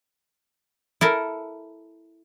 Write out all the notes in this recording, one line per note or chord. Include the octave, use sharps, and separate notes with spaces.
E4 A4 A#4